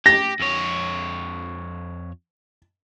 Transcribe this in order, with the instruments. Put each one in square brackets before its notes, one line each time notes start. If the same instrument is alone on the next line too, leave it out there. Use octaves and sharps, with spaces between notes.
[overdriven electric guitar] G4 [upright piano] A#6
[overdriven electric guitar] F2 C#5